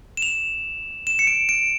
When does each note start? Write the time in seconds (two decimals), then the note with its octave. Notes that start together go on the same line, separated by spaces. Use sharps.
0.17 E7
0.22 F7
1.07 E7
1.19 C#7
1.27 D7
1.49 D7